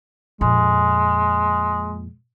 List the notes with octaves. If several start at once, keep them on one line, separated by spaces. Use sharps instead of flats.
F2 A#2 G#3